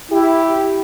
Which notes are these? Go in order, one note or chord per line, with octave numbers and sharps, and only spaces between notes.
E4 G4